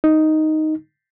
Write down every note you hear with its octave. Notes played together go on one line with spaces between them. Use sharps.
D#4